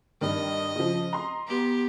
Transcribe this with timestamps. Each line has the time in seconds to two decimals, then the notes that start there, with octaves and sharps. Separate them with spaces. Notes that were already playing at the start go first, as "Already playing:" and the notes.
0.21 G2 D#3 D#5
0.76 C#3 F3
1.13 A#5 C6
1.47 B3 G4